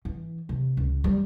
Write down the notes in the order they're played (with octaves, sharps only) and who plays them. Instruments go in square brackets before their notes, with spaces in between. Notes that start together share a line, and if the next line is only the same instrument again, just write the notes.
[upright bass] E3
C3
C#2
G3